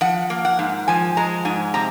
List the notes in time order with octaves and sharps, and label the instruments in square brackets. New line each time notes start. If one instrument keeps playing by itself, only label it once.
[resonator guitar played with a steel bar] F3 F#5
A#3
F#5
G#2
F3 G#5
G#3 A#5
G#2 G#5
C3 A#5